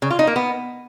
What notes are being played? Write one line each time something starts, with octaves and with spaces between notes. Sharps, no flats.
C#3
F4
D#4
A#3
B3